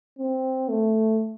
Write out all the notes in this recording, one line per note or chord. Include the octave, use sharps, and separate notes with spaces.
C4
A3